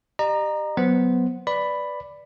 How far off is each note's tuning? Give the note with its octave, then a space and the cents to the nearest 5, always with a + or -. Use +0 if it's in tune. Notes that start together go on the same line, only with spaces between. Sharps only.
G4 +0 D#5 -45 A#5 +5
F#3 +0 B3 +0 C5 +0
B4 +0 D5 +0 B5 +5